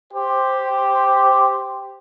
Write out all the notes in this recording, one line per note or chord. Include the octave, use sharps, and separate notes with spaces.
G4 C5